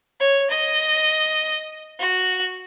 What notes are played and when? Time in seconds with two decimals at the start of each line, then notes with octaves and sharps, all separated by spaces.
0.20 C#5
0.50 D#5
2.00 F#4